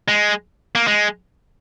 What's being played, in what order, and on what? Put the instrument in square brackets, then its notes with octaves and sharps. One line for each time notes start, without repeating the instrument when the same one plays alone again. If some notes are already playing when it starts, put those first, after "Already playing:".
[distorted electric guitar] G#3
A#3
G#3